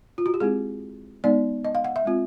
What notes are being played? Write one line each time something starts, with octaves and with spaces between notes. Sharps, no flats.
F4
F#4
G4
G#3 C4 E4 G#4
G#3 B3 D#4 D5
D#5
F5
F#5
E5
G#3 C4 F4